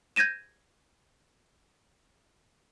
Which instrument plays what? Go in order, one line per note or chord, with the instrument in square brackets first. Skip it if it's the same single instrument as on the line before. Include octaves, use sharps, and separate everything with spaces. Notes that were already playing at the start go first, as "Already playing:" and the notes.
[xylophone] G6 G#6 A#6 D#7 E7